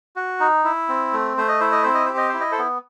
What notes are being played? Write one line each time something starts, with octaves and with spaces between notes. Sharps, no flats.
F#4
D#4
E4
C4
A3
A3 C5
D#5
E4 C5
D#5
C4 C5
D#5
G4 C5
D#5
E4 C5
D#5
A4 C5
B3